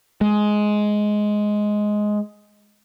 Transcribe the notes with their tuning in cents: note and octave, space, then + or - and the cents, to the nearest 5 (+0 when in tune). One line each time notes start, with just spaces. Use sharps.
G#3 +10